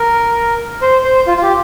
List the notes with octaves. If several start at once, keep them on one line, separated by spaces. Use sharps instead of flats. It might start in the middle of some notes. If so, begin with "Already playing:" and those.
Already playing: A#4
C5
C5
F4
F4
G4